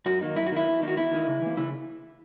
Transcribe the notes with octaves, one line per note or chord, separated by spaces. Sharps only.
F#2 F#4
D#3 A#3 D#4
F#2 E4
F#4
D#3 A#3 D#4 E4
E2
D#3 A#3 D#4
F#4
E2 E4
D#3 A#3 D#4
C#3
E3 A#3
C#3 E4